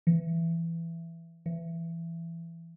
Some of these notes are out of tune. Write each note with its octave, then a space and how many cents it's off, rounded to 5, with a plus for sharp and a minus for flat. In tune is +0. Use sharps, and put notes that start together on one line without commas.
E3 +15
E3 +20